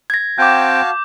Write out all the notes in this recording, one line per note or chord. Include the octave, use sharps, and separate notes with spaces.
G#6 A#6
C4 F#4 F5 G5 A5 D6 G6